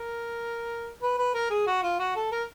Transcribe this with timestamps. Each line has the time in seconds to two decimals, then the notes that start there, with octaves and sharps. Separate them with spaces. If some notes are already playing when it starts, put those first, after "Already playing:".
Already playing: A#4
1.02 B4
1.18 B4
1.34 A#4
1.50 G#4
1.67 F#4
1.83 F4
1.99 F#4
2.15 A4
2.32 A#4